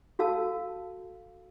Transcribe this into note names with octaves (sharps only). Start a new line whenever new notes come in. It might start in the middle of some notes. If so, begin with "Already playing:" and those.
F#4 A4 F5 A5 E6